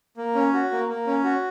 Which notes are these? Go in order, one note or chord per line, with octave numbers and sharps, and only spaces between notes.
A#3
C#4
F#4
A#3
A#3
C#4
F#4